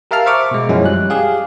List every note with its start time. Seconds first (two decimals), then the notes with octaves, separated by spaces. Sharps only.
0.11 G4 A#4 E5 F5 A5 F6
0.26 C5 E5 C#6 D6
0.51 B2 G#3
0.69 F#2 F3 F#3 G#3 C#4 E4
0.84 G3 F#6
1.10 G4 G#4 F5